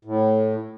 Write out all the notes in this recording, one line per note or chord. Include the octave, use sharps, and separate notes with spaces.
A2